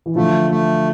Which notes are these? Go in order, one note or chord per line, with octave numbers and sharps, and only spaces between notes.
E3
D3 F3 A3
A3